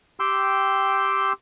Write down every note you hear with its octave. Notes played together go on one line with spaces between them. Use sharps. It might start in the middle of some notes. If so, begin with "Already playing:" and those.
G4 G5 C6 E6